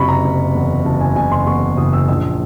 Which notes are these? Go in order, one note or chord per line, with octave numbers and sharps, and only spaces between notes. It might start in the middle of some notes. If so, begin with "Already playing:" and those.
Already playing: F#1 C3 B5 C#6
A#5
F#1
E2
F#1 A5
G#5
F#1 G#5
C6
E2 C#6
F#1 D#6
E6
A#1 E6